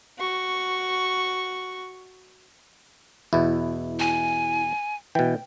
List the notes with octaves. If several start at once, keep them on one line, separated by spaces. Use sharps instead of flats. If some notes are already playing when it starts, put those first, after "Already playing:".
F#4 C#6
E2 B2 E4
G#5
B2 E3 G5